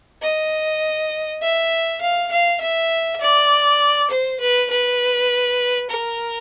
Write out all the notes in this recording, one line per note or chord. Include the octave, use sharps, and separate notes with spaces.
D#5
E5
F5
F5
E5
D5
C5
B4
B4
A#4